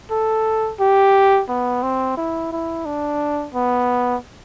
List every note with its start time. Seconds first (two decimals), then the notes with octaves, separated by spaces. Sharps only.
0.11 A4
0.80 G4
1.49 B3
1.83 C4
2.17 E4
2.52 E4
2.86 D4
3.54 B3